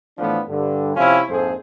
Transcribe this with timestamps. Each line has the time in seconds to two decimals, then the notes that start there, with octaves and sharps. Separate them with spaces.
0.18 A2 E3 F3 B3 D4 F4
0.48 G2 D3
0.96 C3 F3 C#4 E4 F4
1.29 A#1 F2 G#2 G#4 A4 C5